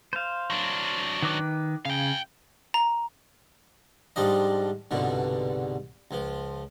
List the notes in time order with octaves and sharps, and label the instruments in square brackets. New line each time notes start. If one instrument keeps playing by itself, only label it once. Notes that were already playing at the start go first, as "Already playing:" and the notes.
[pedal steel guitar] C5 F5
[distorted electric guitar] F#3 D4
[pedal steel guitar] D#3 B4 D6
[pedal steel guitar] C#3 [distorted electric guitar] F5 G5
[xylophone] A#5
[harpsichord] G#2 F3 G3 D4 D#5
C2 G#2 B2 D3
C#2 F3